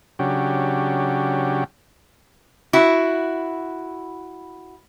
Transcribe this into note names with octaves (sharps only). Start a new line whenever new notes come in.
C#3 F#3 D4 G4
E4 F#4